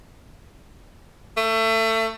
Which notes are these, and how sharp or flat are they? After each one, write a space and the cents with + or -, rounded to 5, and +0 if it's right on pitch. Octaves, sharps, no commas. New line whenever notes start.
A3 +25